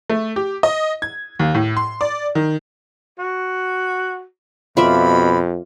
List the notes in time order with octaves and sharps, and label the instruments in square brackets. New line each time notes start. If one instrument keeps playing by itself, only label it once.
[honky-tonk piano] A3
G4
D#5
G#6
D#2
A2
C6
D5
D#3
[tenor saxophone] F#4
[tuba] F2 [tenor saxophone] B2 [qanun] F4 D5 E5 [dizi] B5